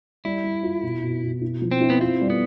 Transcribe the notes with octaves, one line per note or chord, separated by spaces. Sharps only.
G3 E4
G3
F4
B2
B2
B2
E4
F3
C4
E4
B3
C4 F4
G3
B3